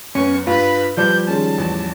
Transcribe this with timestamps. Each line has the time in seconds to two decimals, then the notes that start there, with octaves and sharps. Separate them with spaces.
0.15 F#2 B3 C#4 C#6
0.47 G2 F4 B4
0.97 F3 G3 B4 D5 A5 G6
1.28 D#3 G#3 C#4 A5
1.58 A1 E2